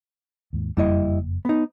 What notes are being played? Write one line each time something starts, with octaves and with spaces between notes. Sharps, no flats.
D#2 G#2
F#1 F2 G3 A#3 E4 D#5
B3 D#4